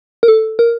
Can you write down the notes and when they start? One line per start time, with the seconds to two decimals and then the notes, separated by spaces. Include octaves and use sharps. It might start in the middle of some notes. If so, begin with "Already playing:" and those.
0.23 A#4
0.28 A4
0.59 A#4